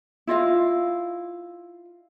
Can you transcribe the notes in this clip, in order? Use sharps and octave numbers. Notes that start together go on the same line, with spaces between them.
E4 F4 D#5 F5